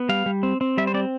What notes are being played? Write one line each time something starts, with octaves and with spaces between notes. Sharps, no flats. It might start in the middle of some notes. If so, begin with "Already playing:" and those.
Already playing: B3
G3 F5
G3
C4
C4
G3 E5
C5
C4 D5